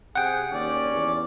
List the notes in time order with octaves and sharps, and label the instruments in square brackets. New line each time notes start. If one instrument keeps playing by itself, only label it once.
[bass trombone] C3 [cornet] G#4 [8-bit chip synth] F#5 G5
[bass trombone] D#2 [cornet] C#4 [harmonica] D5
[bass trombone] E2